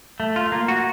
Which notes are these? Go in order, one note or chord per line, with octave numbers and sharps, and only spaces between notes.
A3
F4
A#3
F#4